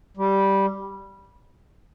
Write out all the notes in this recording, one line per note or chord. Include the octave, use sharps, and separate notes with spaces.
G3